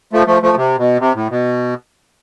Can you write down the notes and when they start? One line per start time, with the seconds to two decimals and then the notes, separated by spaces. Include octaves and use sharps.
0.13 F3 A3
0.27 F3 A3
0.42 F3 A3
0.57 C3
0.78 B2
1.00 C3
1.15 A2
1.30 B2